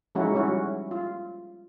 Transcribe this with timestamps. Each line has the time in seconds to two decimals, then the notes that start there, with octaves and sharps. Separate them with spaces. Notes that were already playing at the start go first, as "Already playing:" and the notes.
0.15 F3 G#3 C#4 D#4 E4 F#4
0.34 G3 C#4 E4 F#4
0.91 F4